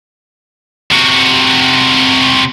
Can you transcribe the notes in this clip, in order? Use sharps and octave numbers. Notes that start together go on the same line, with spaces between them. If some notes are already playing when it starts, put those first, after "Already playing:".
C3 F#4